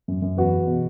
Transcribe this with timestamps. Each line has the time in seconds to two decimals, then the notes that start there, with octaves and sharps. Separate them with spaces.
0.08 F#2
0.22 F#2
0.37 E2 F#4 B4
0.52 E2
0.67 B2